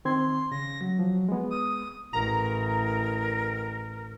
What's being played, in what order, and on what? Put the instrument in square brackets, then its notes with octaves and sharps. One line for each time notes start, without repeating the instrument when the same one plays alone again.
[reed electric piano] D#3 C4 G#6 [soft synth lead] C6
[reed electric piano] C#3 [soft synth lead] A#6
[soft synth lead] F#3
[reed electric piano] F3
G#3 B3
[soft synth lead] D#6
[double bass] A1 [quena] A#4 [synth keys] A#5